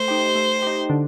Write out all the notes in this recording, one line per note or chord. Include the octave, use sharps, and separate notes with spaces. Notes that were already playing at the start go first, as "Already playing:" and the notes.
Already playing: A3 C5
D#4 G4
A3
D#4 G4
D3